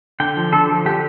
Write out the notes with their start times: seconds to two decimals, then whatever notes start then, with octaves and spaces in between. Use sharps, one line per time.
0.20 D3 G5
0.37 F3
0.52 D3 A4
0.70 F3
0.85 D3 G4